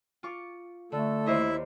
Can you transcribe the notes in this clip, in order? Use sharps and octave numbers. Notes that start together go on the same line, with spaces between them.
F4 C#6 D6
D3 A3 A4
D#2 E4 C5 D#5 E5